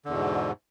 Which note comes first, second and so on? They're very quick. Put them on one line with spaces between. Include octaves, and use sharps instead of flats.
D3 E2 B2 G#2